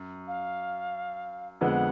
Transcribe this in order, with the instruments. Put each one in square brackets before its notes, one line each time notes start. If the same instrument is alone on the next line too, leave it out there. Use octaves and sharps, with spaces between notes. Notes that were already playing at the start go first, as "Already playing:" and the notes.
Already playing: [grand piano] F#2
[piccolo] F5
[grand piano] F2 D3 G#3 B3 [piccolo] F#5